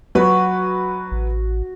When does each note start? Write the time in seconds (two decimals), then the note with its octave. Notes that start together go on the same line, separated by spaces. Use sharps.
0.15 F#3 F#4 B4 B5
1.12 A1